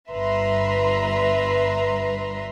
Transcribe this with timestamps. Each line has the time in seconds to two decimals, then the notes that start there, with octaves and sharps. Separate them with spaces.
0.10 G1 G2 B4 E5 A#5 C6